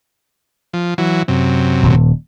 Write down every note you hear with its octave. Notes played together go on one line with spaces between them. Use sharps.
F3
E3 F#3
F#2 C3
D#1